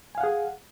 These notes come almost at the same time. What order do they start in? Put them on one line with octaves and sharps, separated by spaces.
G#5 F5 F#5 G#4